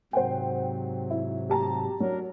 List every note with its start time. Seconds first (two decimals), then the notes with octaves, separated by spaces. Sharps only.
0.13 G#2 C3 F#3 C5 F#5 G5
1.10 E4
1.50 G4 A5 A#5
2.00 F#3 D4 A#4